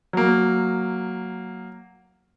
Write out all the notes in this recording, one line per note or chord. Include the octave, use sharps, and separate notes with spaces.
F#3 A#3